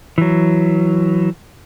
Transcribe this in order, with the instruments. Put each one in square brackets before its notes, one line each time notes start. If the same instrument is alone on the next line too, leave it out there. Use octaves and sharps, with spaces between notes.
[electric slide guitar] E3 F#3